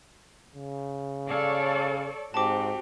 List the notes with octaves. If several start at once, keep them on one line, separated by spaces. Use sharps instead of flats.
C#3
A4 C#5 D5 F5
G#2 C4 F#4 G4 A5 D6